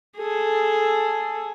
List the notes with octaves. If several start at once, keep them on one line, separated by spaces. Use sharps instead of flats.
G#4 A4